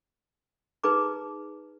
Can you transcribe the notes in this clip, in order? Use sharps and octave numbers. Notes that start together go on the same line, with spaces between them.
D#4 G#4 B4 A#5 D6